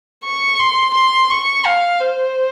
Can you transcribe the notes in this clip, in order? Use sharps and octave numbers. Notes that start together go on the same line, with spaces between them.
C#6
C6
C6
C#6
F5
C5